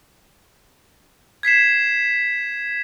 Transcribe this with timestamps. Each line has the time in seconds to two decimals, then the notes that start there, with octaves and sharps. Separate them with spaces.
1.43 G#6 B6 C7 E7